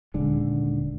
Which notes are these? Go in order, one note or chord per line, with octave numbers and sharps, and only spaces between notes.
D#1 D3 G#3